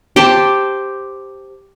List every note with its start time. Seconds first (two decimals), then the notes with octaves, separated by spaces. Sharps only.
0.16 G4 C5 G5 A5